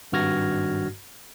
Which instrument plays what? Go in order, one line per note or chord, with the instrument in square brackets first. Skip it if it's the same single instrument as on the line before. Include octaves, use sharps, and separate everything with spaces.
[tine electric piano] G#1 G2 F#4 F6 G#6 A#6